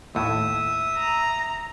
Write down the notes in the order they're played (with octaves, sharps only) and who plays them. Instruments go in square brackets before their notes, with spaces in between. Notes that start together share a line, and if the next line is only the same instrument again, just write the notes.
[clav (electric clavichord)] D#2 A2 [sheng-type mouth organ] E5 D#6
[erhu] A#5